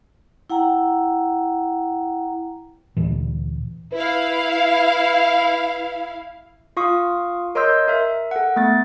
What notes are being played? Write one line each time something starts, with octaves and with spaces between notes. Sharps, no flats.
E4 F#5 G5 A#5
D2 A#2 E3
E4 B4 F5
F4 F5 C#6 D#6
A#4 C#5 D#5 C6 E6 G6
A#4 E5
A4 F#5
A3 B3 A6